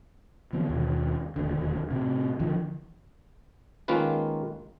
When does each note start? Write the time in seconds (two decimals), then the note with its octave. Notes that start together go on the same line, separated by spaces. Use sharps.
0.53 D3 E3 B3
0.69 D#2 B2
1.36 E1 D#2 D3
1.91 A2 C3
2.40 D3 E3 F3
3.88 D#3 G#3 A#3 C#4 F4 B4